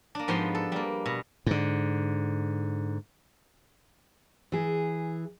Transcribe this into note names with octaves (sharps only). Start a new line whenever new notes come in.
A#3 D4
G#2 F3 B3 G4 G5 C6
A4
G3 A#3
B2
G#2 D3
E3 G#4